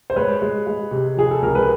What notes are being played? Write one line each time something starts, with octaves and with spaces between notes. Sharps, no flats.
C5
G#3 B4 C#5
G#3
G#3
C3
F3 G#4
A4
C#2 A#4
B4